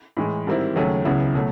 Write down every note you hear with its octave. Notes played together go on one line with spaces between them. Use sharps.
A2 E3 G#3
G#2 D#3 G3 C4 E4
D#2 C#3 F#3 A3 C#4
C#2 C#3 F#3 B3 E4
B2 F#3 A3